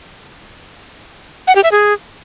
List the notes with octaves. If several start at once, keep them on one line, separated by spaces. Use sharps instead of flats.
F#5
G4
E5
G#4